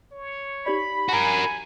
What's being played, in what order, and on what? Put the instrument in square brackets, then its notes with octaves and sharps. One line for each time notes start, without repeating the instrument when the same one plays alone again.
[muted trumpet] C#5
[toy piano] D#4 G4 D5 [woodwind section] B5
[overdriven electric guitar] F#4 A#4 [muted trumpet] G#5